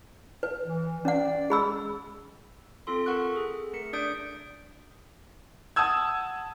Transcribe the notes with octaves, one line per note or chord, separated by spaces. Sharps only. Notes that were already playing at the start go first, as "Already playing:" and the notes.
B4
E3
C#4 D5 F#5
G#3 G#4 B5 E6
C4 F4 A4 C6
A4 A#4 F#5 C#6 F#6
G#4
A3 A#4 C#7
D4 D5 D#6 G6 D7
F#5 A5 D#6 E6 G#6